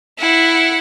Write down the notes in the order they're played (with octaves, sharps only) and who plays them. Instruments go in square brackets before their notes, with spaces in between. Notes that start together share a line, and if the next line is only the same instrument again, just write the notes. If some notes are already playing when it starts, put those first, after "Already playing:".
[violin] E4 F#5